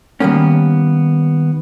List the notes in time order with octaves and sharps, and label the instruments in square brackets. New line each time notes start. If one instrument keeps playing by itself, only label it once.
[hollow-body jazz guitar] D#3 G3 A#3 B3 C#4